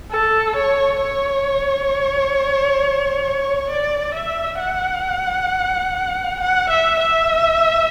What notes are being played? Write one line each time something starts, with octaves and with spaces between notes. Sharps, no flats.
A4
C#5
C#5
D5
E5
F#5
F#5
E5
E5